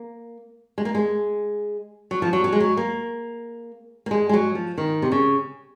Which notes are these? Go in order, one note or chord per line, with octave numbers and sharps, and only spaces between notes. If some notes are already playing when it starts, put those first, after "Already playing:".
Already playing: A#3
G#3
A#3
G#3
F#3
F3
F#3
F#3
G#3
F#3
A#3
A#3
G#3
G#3
F#3
F3
D#3
C3
C#3